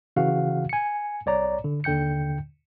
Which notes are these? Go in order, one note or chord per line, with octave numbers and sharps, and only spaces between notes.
C#3 E3 F#4 F5 F#5
G#5 C#7
C2 C#5 D5 A#5
D3
D#2 D3 G5 G6 C#7